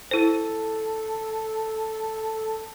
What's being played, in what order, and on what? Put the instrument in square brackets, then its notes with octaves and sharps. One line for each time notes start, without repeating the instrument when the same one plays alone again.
[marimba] E4 C5 [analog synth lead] A4